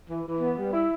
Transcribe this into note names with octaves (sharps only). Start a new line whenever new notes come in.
E3
E3
B3
G3
E4